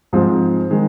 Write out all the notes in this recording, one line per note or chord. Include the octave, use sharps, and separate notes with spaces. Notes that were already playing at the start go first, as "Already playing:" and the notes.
G#2 F3 G#3 C4
D#3 G#3